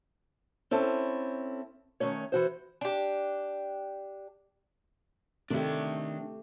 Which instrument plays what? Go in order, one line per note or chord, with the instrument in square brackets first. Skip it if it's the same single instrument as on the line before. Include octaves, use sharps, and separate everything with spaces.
[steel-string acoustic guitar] C4 C#4 E4 A4
D#3 G#3 A3 C#4 C#5
E3 F#4 C5
[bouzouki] D4 G4
[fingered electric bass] C3 [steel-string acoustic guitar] D#3 [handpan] A3 G4 [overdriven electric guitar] D4 E5